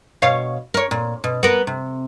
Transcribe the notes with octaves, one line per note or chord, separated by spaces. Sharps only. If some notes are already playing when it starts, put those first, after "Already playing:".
B2 C#5 F5
A#4 C#5
A#2
B2
B3 A#4
C3